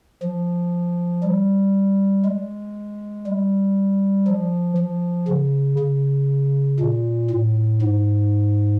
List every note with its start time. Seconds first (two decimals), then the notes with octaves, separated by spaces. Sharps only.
0.23 F3
1.23 G3
2.25 G#3
3.27 G3
4.27 F3
4.77 F3
5.28 C#3
5.79 C#3
6.79 A#2
7.30 A2
7.81 G#2